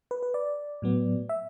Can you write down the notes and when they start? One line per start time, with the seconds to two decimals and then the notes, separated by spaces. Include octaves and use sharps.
0.11 B4
0.23 B4
0.34 D5
0.82 A2 F#3 B3
1.29 E5